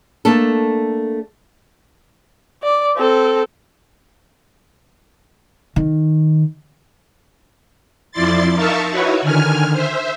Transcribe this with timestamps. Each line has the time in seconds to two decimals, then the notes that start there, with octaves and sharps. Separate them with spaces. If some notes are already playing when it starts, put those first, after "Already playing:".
0.25 A3 A#3 D4 A4
2.63 D5
2.97 C4 A4
5.76 D#3
8.12 F2 F3 E4 D5 C6 A6
8.55 D#4 A#4 E5 F5 A5 C#6
8.90 D#4 E4 F#4 B4 C#5
9.21 D3 D#3 G#5 F6
9.72 C5 E5